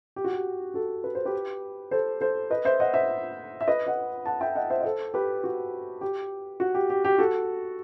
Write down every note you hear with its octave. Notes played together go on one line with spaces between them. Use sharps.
G4
F#4
G4
F#4 A4
B4
C5
G4 B4
A4 C5
A4 C5
B4 D#5
C5 E5
D#5 F#5
C5 E5
E5
B4 D#5
D#5 F#5
F#5 A5
E5 G5
D#5 F#5
C5 E5
D#5
A4 C5
G4 B4
F#4
G4
F#4
G4
G4
G4
F#4 A4